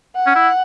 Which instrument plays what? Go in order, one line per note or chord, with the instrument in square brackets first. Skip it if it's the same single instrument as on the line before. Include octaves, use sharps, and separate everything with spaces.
[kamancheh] F#5
[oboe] C#4
E4